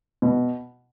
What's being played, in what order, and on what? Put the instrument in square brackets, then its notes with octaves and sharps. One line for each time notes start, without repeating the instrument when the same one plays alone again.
[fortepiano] B2